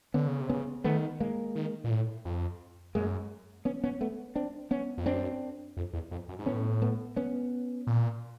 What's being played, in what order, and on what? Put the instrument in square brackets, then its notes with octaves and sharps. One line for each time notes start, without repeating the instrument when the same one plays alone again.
[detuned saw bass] D3 [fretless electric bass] B3 C#4
[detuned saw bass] C#3
C3
[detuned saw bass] C#3 [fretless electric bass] B3 C#4
[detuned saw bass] D#3 [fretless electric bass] A3 B3
[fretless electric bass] G#3 A#3
[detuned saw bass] D#3
A#2
A2
F2
[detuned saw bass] F#2 [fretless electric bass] G#3 A#3
[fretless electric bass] B3 C#4
B3 C#4
A3 B3
C4 D4
B3 C#4
[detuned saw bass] F2
[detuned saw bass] F#2 [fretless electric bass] C4 D4
[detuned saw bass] F2
E2
F2
F#2
G#2
[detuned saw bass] A2 [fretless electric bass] B3 C#4
[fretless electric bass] A3 B3
B3 C#4
[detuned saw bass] A#2